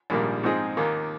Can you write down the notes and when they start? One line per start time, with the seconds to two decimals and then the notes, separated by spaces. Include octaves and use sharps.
0.10 A#1 G#2 D#3 G3 A#3
0.43 G#2 F3 C4 D#4 G#4
0.77 D#2 D#3 A#3